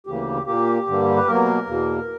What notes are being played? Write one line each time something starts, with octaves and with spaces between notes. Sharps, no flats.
D2 C#3 E3 A#3 G4
A#2 A#3 G4
G2 D3 G3 A#3
B4
B2 F#3 A#3 A#4
E2 B2 A#3